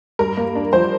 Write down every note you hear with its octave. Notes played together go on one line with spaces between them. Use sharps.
G2 A#4
A#3
D4
F3 C5